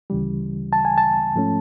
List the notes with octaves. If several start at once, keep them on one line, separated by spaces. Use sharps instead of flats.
D2 C#3 E3 G3
A5
G#5
A5
G#2 F3 A3 C#4